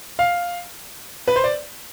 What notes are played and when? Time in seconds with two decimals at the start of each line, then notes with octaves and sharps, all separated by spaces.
0.19 F5
1.28 B4
1.36 C5
1.44 D5